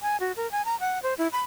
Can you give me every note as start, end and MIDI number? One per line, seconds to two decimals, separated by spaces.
0.02 0.17 80
0.20 0.32 66
0.37 0.50 70
0.51 0.65 80
0.65 0.78 82
0.80 1.02 78
1.03 1.14 72
1.18 1.28 64
1.32 1.40 83